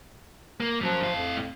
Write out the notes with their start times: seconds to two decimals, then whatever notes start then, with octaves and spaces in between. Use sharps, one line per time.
0.60 A#3
0.81 F#2 F3 F#3
1.03 A2 F5
1.15 F2